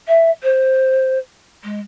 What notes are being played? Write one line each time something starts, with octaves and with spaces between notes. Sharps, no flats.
E5
C5
G#3